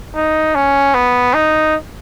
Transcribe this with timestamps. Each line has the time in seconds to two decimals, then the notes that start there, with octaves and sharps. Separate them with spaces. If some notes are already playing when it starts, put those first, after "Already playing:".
0.15 D#4
0.55 C#4
0.94 B3
1.34 D#4